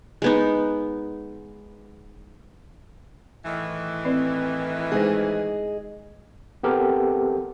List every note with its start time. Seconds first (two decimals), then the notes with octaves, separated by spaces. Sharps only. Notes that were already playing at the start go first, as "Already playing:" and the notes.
0.22 G#3 B3 D#4
3.45 A2 D#3 E3
4.05 C4 B4 D5
4.92 G#3 D#4 G#4 C5 D#5
6.63 B3 C4 G4 A4 A#4